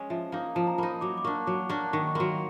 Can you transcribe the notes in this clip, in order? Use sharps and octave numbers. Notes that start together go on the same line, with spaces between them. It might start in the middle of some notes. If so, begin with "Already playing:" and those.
Already playing: G#3 C#4
F3 E5
A#3 D#4 F5
F3 A5
A#5
A#3 D#4 B5
F#3 D6
D6
A#3 D4 C#6
F#3 D6
A#3 D4 C#6
D#3 C#6
C#6
F#3 A#3 C6